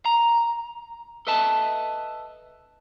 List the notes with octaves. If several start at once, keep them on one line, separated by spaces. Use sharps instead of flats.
A#5
A4 B4 D#5 E5 A5